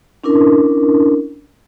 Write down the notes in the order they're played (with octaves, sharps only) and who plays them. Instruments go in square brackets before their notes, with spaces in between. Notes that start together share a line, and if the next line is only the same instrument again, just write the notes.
[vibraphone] C#4 D4 E4 A#4